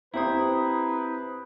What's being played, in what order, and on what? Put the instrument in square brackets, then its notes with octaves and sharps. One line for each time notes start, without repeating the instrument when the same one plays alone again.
[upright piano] C4 G4 C5 [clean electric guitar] E4 [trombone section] B4 [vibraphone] A#5 D#6